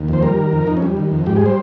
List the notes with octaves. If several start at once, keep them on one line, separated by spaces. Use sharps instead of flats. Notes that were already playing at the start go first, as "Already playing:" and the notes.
Already playing: D#2
F2 C5
G3 A#4
D#3
F2
F2 D#4
C#4
G3
D#3
F2
G#2 G4
G#4
G3 C5